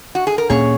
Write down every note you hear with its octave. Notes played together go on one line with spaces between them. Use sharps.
F#4
G#4
A#4
A#2 A#3 C#4 G#4 C#5